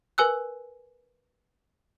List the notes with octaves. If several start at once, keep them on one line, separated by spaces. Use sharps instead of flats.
A#4 B4 G#5 E6 F#6